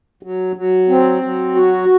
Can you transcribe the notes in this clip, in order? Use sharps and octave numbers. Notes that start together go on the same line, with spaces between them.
F#3
F#3
C4
F#3
F#4